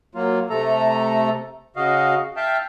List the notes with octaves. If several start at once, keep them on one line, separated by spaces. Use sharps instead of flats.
F#3 A#3 F4
C3 A3 A4 A#5
C#3 F#4 D#5 F5
E5 F5 G5 A5